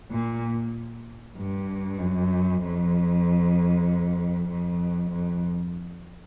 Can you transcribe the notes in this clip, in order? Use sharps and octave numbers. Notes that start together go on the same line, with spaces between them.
A#2
G2
F#2
F2
F2
F2